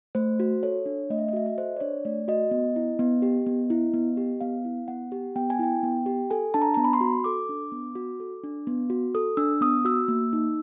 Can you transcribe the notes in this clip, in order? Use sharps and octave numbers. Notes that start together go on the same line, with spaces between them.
A3 C5
F#4
A4 C#5
D4
A3 D#5
E5
D#5
F#4 E5
D#5
A4 C5
D5
D4 C#5
A3 D5
F#4 D#5
B3
E4
B3
G4
B3
E4
B3
G4
B3 F5
E4
B3 F#5
G4
B3 G5
G#5
E4 G5
B3
G4
A4 G#5
D4 A5
A#5
B3 A#5
B5
C6
F#4
A4 D6
D4
B3
F#4
A4
D4
B3
F#4
A4 D#6
D4 E6
B3 D#6
F#4 E6
A#3
D#4